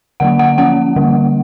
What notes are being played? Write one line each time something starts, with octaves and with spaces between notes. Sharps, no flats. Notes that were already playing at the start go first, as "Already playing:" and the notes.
D3 F#3 A#3 F#5
F#5
F3 A#3 C#4 F#5
D3 G3 A#3